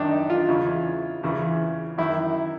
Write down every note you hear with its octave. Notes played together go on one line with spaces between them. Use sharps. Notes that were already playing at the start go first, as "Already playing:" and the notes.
Already playing: F#2 D#3 D4 D#4
D#4
F4
E2 C#3 E3
E2 C#3 E3
F#2 D#3 E4